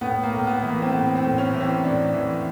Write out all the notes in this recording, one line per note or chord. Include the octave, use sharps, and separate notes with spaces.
A2 B3
A#3
A2
B3
E3
A#3
C4
A2 B3
C4
A2
C#4
E3
C4
A2 D4
E3